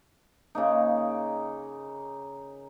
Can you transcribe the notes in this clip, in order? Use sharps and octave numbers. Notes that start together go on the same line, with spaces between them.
C#3 A#3 D#4